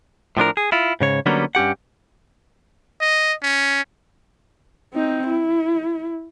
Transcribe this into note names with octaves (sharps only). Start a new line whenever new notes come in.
A2 F3 D4 A#4
G#4
E4 F4
G#2 C#3 C#5
D3 F#3 G3 A#3 B3 C#4
G2 C#4 G4 F#5
D#5
C#4
C4 D#4
E4